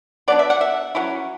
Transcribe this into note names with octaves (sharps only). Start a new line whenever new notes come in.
F#3 B3 D4 D5
E5
F#5
E5
F#3 C#4 E4